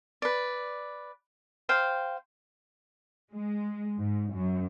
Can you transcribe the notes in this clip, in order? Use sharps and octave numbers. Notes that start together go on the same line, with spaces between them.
B4 D5
C5 F5 G5
G#3
G#2
F#2